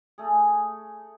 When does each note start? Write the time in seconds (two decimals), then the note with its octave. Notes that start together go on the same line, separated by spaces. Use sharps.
0.18 A3 G#4